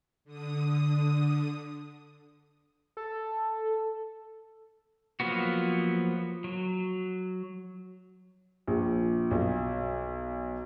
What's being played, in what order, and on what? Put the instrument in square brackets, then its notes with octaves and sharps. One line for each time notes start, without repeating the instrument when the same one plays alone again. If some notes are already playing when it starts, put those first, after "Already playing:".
[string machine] D3 D#6
[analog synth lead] A4
[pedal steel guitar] F3 F#3 A#3 B3 F#4
F#3
[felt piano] A#1
B1